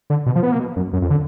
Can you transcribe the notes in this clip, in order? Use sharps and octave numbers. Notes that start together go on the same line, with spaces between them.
D3
B2
F3
B3
A#3
B2
F#2
F#2
F2
D3